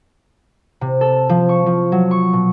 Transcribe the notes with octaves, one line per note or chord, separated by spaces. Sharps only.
C3
A4
F3
C#6
F3
F#3
C#6
B2